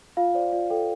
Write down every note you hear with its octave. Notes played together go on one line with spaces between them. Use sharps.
F4 F5
C5 D5
F4 D5
A4 G5